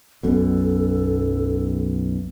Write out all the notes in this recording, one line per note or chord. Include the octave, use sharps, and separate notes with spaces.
B1 F#2 B2 A4